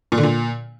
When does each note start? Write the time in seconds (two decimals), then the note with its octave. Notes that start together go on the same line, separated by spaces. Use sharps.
0.12 A#2
0.18 D3
0.23 A#2